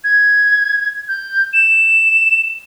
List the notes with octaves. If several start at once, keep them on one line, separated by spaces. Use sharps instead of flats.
G#6
G6
E7